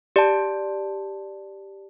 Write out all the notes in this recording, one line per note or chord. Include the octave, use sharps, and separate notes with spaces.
G4 D5 A5